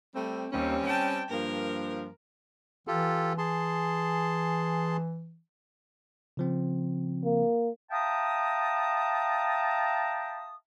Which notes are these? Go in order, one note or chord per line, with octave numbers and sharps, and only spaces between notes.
G3 A3 C4
D#2 G3 C4 C#4
G5 A5
G2 F3 A#3 A#4
E3 F4 G4 A4
G#4 A5 C6
C#3 F3 C4
A#3
E5 F5 G5 A5 A#5 D#6